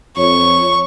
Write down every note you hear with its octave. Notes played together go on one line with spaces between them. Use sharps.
F2 C#5 C#6